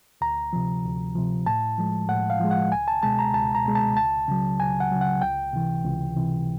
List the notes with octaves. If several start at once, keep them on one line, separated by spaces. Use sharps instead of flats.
D2 A#5
C3 F3
D2
C3 F3
A2 A5
F3 G#3
A2 F#5
F5
F3 G#3
F#5
C#2 G#5
A5
B2 G#3 A5
A#5
C#2 A5
A#5
B2 G#3
A5
C#2 A5
C#3 F#3
C#2 G#5
F#5
C#3 F#3
F#5
C#2 G5
C3 E3
C#2
C3 E3